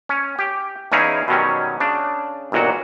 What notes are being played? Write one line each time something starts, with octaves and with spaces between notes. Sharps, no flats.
C#4
G4
E2 C#4 D#4 E4 G#4 F5
B2 D#3 F#3 G3 C#4
C#3 D4
G1 D#2 A#2 F#3 F#4